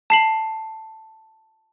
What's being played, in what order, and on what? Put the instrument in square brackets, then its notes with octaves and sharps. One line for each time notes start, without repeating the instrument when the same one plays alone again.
[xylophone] A5 C7 F#7